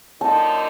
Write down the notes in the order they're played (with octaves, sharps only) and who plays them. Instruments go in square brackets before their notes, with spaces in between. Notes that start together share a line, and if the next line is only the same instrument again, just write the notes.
[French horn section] F#2 D3 F3 A#3 D#4 [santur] A5